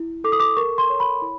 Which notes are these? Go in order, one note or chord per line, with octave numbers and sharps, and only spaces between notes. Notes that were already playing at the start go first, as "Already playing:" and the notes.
Already playing: E4
A4 D6
D#6
D6
A#4 C#6
C6
C#5
B5
E4